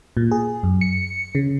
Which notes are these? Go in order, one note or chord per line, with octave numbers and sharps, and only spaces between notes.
A#2
G#4
F#2
C#7
C#3